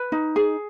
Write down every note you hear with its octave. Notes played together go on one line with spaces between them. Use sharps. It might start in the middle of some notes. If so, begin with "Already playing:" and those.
Already playing: B4
D#4
G#4